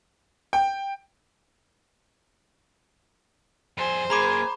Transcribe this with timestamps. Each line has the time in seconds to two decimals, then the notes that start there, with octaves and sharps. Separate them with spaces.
0.53 G5
3.78 F2 G#4 C5
4.10 F#2 A#3 G#4 A#5 B5 D6